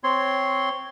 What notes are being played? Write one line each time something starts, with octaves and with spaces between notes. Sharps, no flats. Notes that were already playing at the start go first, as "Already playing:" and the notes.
C4 C#5 C6